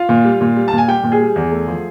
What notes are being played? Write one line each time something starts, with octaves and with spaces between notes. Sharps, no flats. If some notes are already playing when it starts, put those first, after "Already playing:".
Already playing: F4 F5
A#2
G3
A#2
G3
A#2 A5
G#5
G3 G4 G5
A#2
G#4 G#5
G3
E2
A3
F3